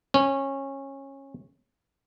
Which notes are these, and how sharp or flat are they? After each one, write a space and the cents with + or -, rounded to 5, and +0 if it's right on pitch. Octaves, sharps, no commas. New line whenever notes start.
C#4 -20